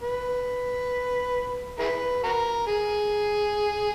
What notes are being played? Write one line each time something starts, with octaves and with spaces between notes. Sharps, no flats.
B4
E4 G#4 B4
F#4 A#4
G#4